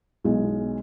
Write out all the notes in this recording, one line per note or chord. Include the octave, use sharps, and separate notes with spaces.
B1 G#3